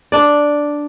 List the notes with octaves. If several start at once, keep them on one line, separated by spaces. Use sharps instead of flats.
D4 D5